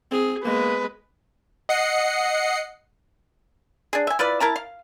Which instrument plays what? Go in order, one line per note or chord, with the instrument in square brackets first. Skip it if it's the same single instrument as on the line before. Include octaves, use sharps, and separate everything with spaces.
[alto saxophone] C4 [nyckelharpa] G#4
[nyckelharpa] G#3 B3 [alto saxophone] A#3 [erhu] B4
[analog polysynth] D#5 F#5 C7 C#7
[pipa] D4 G#4
E5 G#5
E4 F4 B4 D5
E4 A#4 A5 A#5
F5